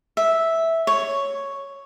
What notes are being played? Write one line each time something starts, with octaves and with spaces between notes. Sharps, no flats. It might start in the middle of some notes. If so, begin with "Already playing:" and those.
E5
C#5